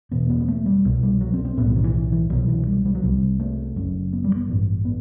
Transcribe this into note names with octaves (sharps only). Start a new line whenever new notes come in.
E1 E2 B2 B3
B3
B3
A3
G3
C2 B2
G3
F#3
C4
C4
B1 A2 B3
G3
E3
D#3
E3
E3
E3
C2 B2 F#3
E3
G3
G3
F#3
C2 C3 G3
A3
F#1 F#2
B3
G3
B3
A1 G2
B3